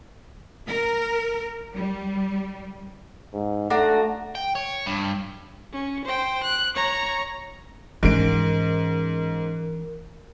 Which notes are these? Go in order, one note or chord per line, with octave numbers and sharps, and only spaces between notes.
A#4
G3
G#2
A3 D4 F#4 A#5
G5
C#5
G2
C#4
C5 G5
F#6
C#5 A#5
G#2 E3 C#4 A#4 D7